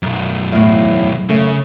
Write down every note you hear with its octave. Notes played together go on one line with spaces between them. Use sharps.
B1 F#2
E2 A2
F#2 C#3 A3